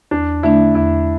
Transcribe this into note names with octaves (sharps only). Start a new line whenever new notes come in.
E2 D4
D3 A3 D4 E4
E2 E4